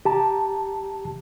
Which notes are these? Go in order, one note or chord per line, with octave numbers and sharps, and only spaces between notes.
G4 A5 A#5